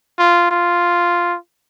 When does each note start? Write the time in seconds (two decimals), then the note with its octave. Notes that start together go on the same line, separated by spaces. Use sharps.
0.19 F4
0.51 F4